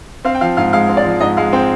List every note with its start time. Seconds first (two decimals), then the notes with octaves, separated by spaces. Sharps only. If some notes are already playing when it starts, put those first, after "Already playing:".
0.25 C4 F5
0.35 G5
0.41 F3 F5
0.57 G#2 F5
0.73 G#3 F5
0.89 C4
0.97 D5
1.05 F3
1.20 G#2 D#5
1.37 G#3 F5
1.53 C4 G5